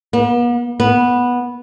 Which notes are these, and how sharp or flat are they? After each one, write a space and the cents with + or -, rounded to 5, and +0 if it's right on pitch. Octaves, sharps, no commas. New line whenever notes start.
B3 -45
B3 -10